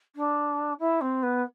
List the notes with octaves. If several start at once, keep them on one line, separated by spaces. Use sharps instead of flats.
D4
E4
C4
B3